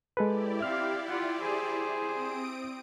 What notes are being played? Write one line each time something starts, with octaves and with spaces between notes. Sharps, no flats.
G#3 E4 G4 A4 B4 D5
C4 E5 F5 F6
F4 F#5
G#4 C5
C4 D#6 D7